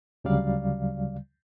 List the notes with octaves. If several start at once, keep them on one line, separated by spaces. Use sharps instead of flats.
D2 C#3 F#3 G3 D5 F5